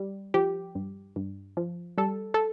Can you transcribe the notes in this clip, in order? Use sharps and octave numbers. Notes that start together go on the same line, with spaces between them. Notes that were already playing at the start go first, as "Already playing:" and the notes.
Already playing: G3
F3 G4
G2
G2
F3
G3 A4
A4